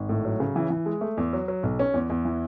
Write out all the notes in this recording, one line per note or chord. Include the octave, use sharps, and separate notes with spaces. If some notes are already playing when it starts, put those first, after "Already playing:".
Already playing: G#1
A2
F#3
C#3
E3
E3
G#3
A3
E2
F#3
F#3
B1
C#4
E2
E2
E3